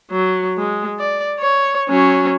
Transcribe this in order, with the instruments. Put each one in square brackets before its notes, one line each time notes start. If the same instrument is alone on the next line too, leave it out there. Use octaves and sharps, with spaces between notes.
[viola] F#3
G#3
D5
C#5
F#3 C#4